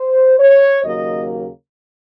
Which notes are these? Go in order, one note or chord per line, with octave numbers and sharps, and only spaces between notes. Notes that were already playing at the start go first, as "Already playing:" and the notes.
Already playing: C5
C#5
D#2 C#3 F#3 A#3 D#5